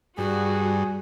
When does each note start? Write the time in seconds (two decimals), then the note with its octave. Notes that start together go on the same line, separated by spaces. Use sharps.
0.18 G2 G3 F#4 G#4